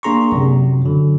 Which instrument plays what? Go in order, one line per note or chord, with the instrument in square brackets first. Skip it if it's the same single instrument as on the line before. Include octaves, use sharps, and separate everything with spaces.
[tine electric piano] A#3 D4 G#4 A#5 C6 C#6
F#2 C3
D3 F#3